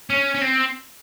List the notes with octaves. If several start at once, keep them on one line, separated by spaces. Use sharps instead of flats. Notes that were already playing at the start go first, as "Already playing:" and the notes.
C#4
C#4
C4